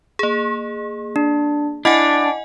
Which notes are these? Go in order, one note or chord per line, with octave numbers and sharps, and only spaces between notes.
A#3 G#4
D4
D4 E4 D#5 F#5 G#5